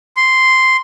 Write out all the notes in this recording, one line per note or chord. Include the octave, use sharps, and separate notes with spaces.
C6